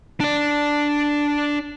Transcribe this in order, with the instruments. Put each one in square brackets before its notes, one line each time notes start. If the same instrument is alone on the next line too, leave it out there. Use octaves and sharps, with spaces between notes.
[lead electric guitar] D4 D5